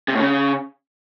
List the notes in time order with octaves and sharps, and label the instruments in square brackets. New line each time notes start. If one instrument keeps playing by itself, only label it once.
[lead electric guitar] C3
A2
C#3